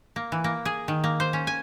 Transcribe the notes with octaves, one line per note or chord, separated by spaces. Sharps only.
A#3
E3
A#3
G#4
D#3
A#3
C5
C#4
G#5